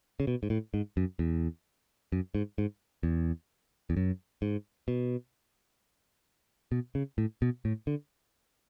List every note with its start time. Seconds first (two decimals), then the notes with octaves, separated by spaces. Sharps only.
0.20 C#3
0.27 B2
0.43 G#2
0.50 A2
0.74 G#2
0.97 F#2
1.19 E2
2.12 F#2
2.35 G#2
2.58 G#2
3.03 E2
3.90 E2
3.97 F#2
4.42 G#2
4.88 B2
6.72 B2
6.95 C#3
7.18 A2
7.42 B2
7.65 A2
7.87 D3